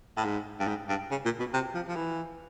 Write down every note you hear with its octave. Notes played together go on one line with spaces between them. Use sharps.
A2
G#2
G2
G#2
G2
C#3
A#2
B2
C3
F3
F3
E3